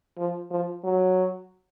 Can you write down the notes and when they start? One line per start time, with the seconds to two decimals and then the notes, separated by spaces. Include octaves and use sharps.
0.18 F3
0.50 F3
0.84 F#3